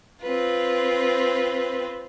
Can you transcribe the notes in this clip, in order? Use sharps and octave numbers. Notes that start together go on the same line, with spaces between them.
C4 F4 B4